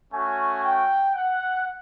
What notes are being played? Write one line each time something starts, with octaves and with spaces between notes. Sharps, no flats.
A3 C#4 F#4 G#5
G5
F#5